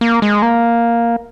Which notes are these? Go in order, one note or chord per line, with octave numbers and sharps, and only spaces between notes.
A#3
G#3
A#3